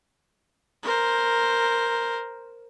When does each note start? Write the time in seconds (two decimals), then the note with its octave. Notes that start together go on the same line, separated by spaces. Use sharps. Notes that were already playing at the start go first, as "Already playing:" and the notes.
0.83 A#4 C5